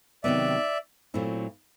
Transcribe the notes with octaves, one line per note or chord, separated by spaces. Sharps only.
C3 D#3 F#3 B3 D5 E5
A#2 F#3 A3 C4 E4